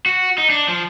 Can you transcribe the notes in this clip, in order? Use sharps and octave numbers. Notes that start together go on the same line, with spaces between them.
F#4
D#4
D4
F3